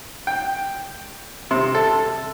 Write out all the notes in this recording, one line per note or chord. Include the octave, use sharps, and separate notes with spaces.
G5
C3
A4